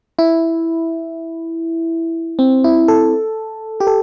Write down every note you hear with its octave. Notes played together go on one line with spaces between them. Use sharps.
E4
C4
E4
A4
G4
A4